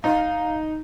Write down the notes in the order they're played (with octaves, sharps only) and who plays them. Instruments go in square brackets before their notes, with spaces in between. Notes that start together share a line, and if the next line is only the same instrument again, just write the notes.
[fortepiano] D#4 [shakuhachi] F5